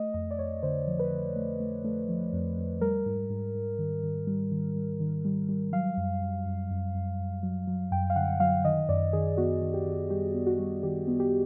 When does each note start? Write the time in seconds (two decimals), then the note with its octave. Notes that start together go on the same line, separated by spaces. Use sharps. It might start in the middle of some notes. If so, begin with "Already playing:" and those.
Already playing: A3 D#5
0.14 F2 D#5
0.31 D5
0.39 F2 C#5
0.63 D3 C5
0.87 F3
0.99 B4
1.11 D3
1.36 A3
1.60 A3
1.84 A3
2.09 F3
2.33 F2
2.57 F2
2.81 G3 A#4
3.06 G#2
3.30 G#2
3.55 G#2
3.79 D#3
4.03 D#3
4.27 G3
4.52 D#3
4.76 G3
5.00 D#3
5.25 G3
5.49 G3
5.73 F#3 F5
5.97 F#2
6.22 F#2
6.46 F#2
6.70 F#2
6.94 F#2
7.19 F#2
7.43 F#3
7.67 F#3
7.91 F#2 G5
8.10 F5
8.16 D3 F#5
8.40 F#3 F5
8.65 D#3 D#5
8.89 F#2 D5
9.13 D#3 G#4
9.37 B3 F#4
9.62 D#3
9.74 G4
9.86 D#3
10.10 G3 G4
10.34 B3
10.47 F#4
10.59 G3
10.83 D#3 G4
11.08 B3
11.20 G4